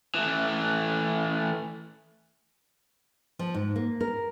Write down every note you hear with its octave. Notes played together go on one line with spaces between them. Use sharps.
E3 A3
F3
G#2
A#3
A#4